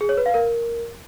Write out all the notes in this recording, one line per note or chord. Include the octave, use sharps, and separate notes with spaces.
G#4
C#5
B4
F5
A#4